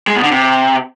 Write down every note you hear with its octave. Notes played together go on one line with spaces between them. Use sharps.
G#3
B2
D3
C3